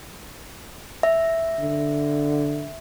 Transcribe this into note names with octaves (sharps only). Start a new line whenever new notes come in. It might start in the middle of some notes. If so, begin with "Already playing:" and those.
E5
D3